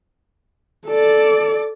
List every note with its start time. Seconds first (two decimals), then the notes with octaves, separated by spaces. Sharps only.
0.86 A4 D5